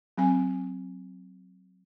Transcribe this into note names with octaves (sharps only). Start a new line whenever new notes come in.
F#3 C4 G#5